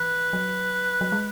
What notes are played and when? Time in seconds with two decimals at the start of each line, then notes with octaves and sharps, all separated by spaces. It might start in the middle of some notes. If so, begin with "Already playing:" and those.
Already playing: E3 B4
0.33 F#3
1.01 F#3
1.12 G#3